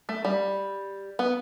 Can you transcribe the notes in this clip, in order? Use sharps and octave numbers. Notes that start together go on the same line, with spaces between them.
A3
G3
B3